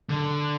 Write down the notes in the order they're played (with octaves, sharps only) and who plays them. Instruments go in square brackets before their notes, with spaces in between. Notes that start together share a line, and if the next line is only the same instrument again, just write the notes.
[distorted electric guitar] D3